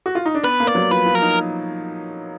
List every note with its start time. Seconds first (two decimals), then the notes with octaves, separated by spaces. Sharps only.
0.06 F#4
0.15 F4
0.26 D#4
0.34 D4
0.43 B3 B4
0.60 A#3
0.67 D5
0.75 F#3
0.91 F3 B4
1.06 F3
1.15 A#4
1.22 D#4